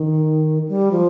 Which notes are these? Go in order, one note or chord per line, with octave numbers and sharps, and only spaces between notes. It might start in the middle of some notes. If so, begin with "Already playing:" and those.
Already playing: D#3
G3
F3